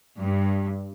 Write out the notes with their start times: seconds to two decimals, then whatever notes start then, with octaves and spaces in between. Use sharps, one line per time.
0.20 G2